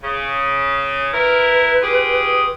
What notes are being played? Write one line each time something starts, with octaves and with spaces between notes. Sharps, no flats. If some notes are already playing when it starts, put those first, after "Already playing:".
C#3
E4 A#4 B4
F4 G4 G#4